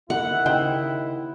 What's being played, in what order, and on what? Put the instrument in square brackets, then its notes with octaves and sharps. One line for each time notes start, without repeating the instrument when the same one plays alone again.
[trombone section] D#2 E4 [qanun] F#5
[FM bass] C#3 [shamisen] D#4 C5 G5